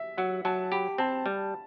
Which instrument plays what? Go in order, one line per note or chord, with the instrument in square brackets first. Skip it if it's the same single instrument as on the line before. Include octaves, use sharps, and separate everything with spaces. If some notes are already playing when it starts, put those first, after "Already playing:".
Already playing: [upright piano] E5
[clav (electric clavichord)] F#3 [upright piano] F#5
[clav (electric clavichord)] F#3 [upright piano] A5
[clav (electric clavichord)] G4 [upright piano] B5
[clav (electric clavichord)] C4 [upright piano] A5
[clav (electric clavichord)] G3